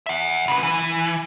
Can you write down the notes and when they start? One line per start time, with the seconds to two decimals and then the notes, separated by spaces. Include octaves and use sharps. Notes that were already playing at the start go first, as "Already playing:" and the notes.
0.06 E5 F#5
0.48 C#3 B4
0.63 E3